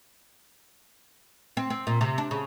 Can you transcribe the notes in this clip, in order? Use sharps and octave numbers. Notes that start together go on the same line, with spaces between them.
C4
C4
A#2
C3
D4
C#3